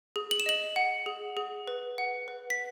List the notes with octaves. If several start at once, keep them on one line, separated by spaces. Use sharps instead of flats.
G#4
F#7
E7
D#5 F#7
F#5
G#4
G#4
B4
F#5
B4
B6